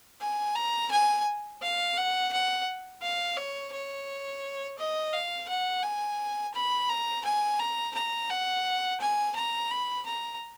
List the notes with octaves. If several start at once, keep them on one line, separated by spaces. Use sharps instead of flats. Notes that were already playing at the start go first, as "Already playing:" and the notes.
G#5
A#5
G#5
F5
F#5
F#5
F5
C#5
C#5
D#5
F5
F#5
G#5
B5
A#5
G#5
A#5
A#5
F#5
G#5
A#5
B5
A#5